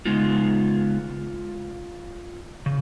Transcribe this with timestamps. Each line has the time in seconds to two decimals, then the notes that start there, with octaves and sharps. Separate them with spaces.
0.05 C#3 G#3 B3 D#4 F4
2.66 C#3